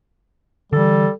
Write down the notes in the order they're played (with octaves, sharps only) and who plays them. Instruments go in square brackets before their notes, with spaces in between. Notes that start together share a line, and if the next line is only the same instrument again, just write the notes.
[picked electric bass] D3 E3 [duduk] G3 [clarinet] A4